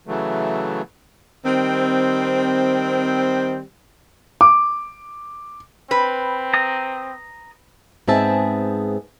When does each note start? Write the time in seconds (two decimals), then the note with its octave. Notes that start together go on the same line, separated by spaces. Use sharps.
0.07 C#3 E3 F#3 A3
1.44 D#3 G3 C4
4.41 D6
5.91 C4 B4
6.54 A#5 D#6
8.08 G#2 B3 C4 G#4 E5 A5